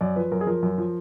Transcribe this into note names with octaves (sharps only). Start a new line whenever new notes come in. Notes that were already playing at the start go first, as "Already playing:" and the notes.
F#2 D5
F3 B4
F#2 A#4
G#4
F3 A#4
F#2
F3